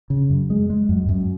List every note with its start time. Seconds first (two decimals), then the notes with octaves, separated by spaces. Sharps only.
0.10 C#3
0.30 F#2
0.50 G#3
0.70 G#3
0.89 F#2
1.09 F#2